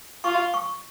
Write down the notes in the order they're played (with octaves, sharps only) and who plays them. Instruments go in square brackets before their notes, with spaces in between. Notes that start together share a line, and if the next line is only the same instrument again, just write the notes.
[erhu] F4 [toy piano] C#6
[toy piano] C#6